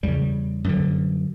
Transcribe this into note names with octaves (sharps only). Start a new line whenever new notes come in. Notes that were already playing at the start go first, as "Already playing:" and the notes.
E2 C#3 G3
F#2 D3